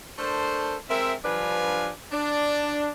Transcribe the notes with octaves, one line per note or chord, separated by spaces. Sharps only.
A3 D4 A4 A#4 C5
G#3 C4 A#4 E5
G2 F3 D4 B4 F5 G#5
D4